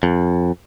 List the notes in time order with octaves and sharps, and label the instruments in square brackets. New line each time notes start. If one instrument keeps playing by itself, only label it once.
[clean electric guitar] F2